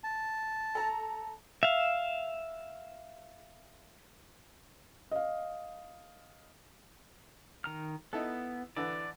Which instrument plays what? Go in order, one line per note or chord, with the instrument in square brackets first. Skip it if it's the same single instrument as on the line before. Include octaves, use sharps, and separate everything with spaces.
[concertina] A5
[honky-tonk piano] A4 A#5
[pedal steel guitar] E5 F5
[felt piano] D#5 F5
[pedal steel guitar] D#3 A#5 F6
[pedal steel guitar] B3 [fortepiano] D#4 E4 A4
[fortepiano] D3 E3 [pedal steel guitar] D5